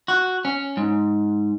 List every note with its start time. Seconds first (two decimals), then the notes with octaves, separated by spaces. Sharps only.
0.08 F#4
0.45 C#4
0.77 G#2